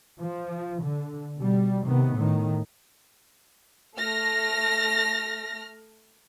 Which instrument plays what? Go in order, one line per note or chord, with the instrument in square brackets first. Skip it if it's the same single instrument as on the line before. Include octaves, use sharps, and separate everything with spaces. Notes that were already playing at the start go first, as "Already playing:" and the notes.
[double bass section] F3
D3
B2 G3
C3 D#3 B3
A2 D#3
[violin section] A3 F6 A#6